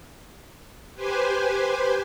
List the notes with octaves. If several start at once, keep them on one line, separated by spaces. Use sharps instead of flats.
G4 B4 C5 G#5